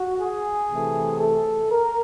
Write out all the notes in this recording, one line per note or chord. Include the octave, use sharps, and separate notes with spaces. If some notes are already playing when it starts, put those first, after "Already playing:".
Already playing: F#4
G#4
C3 E3 A3
A4
A#4